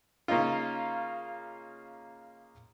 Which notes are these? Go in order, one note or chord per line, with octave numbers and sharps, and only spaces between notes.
C#3 A#3 C#4 D#4 F4